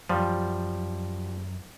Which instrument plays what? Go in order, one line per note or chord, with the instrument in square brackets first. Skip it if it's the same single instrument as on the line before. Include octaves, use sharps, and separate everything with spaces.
[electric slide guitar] F#2 [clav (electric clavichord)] F3 G3